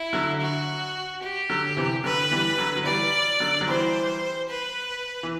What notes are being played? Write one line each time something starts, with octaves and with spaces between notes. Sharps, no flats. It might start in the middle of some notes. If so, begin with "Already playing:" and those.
Already playing: E4
D3 F#3
F#4
G4
D3 F#3
C3 E3
D3 F#3 B4
E3 G3
D3 F#3
F#3
E3 G3 D5
D3 F#3
F#3
E3 G3 C5
B4
E3